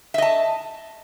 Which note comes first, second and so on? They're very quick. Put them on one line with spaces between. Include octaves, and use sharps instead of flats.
E5 D#5 A5